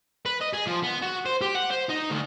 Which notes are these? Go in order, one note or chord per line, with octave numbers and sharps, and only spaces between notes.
B4
D#5
G#4
F3
B3
F#4
C5
G4
F#5
C5
D#4
D2